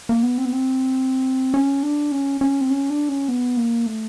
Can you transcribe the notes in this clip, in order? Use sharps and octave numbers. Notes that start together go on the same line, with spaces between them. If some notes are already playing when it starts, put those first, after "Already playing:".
A#3
B3
C4
B3
C4
C#4
D4
C#4
C#4
C4
C#4
D4
C#4
B3
A#3
A3